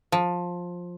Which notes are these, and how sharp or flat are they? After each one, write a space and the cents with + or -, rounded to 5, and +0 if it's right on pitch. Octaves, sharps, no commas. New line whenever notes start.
F3 +15